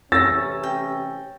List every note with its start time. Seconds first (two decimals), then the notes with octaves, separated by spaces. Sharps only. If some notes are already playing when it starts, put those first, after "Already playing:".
0.12 A1 C3 C#4 E6 A6 A#6
0.63 G5